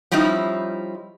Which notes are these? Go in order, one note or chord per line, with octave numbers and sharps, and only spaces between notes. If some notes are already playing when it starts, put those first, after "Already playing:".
F3 G3 C#4 D#4 E4